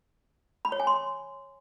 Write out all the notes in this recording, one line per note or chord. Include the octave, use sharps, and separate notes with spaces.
B5
C#5
G#5
C6